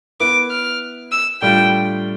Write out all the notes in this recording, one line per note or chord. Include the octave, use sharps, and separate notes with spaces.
B3 E4 B4 D6
F6
E6
A2 G3 D4 F4 G5